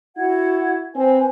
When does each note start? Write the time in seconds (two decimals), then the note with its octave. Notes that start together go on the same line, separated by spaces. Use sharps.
0.17 E4 F#4 F#5 G#6
0.95 C4 B4 C5 G#5